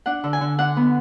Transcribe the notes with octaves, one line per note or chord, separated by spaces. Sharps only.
D4 F#5
D3
G#5
D3
D4 F#5
B3